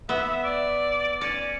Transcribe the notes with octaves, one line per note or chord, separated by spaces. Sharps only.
B3 E5
D5
C#4 D5